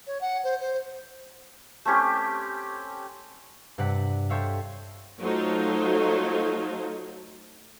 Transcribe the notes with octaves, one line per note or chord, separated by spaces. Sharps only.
C#5
F#5
C5
C5
A3 C4 C#4 G4
G2 C3 D5 F#5 B6
G4 A4 C5 C#5 E5 F5
F#3 A3 D#4 F4 A4 C5